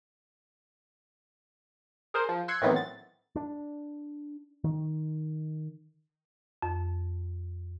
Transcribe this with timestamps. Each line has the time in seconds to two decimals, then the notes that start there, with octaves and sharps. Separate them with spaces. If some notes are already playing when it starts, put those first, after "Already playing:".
2.14 G#4 A#4 C5
2.29 F3
2.48 C6 E6 F#6 G#6 C#7
2.62 A2 D#3 E3 F#3 B3 C4
2.76 A6
3.36 D4
4.64 D#3
6.62 F2